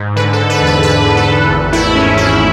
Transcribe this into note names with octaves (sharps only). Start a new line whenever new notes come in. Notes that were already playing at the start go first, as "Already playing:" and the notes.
Already playing: G#2
D3 B4
A4
D3
B4
E2
B4
D3 B4
E2
A4
E2
G#1
A3 E4
G#2 C#4
G#2 E4